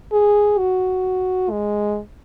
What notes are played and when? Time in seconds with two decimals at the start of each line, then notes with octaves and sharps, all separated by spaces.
0.12 G#4
0.59 F#4
1.50 G#3